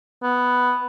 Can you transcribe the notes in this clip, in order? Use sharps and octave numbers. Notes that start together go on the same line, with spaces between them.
B3